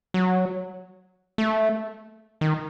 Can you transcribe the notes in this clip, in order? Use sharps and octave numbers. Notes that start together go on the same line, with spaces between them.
F#3
A3
D#3